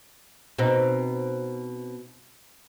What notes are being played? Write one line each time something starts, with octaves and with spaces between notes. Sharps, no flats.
B2 C4 D#4